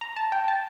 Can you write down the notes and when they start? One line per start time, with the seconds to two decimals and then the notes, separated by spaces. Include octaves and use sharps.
0.01 A#5
0.16 A5
0.32 G5
0.48 A5